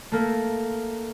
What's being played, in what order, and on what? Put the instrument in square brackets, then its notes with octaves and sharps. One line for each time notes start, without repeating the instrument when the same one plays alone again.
[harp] A3 A#3